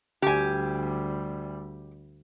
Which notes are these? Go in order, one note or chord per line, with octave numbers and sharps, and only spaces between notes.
D2 G3 G4 G#5